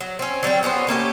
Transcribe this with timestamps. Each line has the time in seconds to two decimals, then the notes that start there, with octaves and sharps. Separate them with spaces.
0.01 F#3
0.19 C4 C#4
0.43 F#3 G3 C4 G5
0.63 B3 C#4 F#4 C5
0.87 A3 A#3 C#4 G4